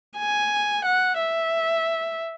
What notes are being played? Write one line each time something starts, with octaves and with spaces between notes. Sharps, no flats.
G#5
F#5
E5